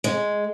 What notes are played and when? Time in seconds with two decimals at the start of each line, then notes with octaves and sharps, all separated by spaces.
0.04 G#3